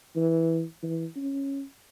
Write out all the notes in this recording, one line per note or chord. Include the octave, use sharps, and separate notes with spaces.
E3
E3
C#4